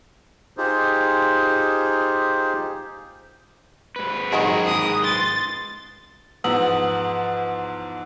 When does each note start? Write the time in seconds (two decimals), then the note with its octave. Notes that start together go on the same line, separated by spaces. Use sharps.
0.57 D#4 F4 G4 G#4 C5
3.96 G#2 B4
4.33 D#3 G#3 F#4 G#4 A#4
4.66 D#6
5.04 C6 A6
6.44 E2 G#2 F3 B4 F#5 D#6 E6 F#7